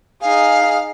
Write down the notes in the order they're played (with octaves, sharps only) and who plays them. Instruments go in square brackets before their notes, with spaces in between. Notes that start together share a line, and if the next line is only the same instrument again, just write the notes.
[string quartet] D#4 G#4 [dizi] F5